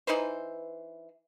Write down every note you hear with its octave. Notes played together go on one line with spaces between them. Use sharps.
E3 D#4 B4 C5